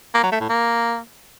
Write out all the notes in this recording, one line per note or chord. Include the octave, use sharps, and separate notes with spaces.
A#3
F#3
A3
A2
A#3